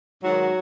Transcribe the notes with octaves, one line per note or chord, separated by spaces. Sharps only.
G#2 D#3 F#3 F#4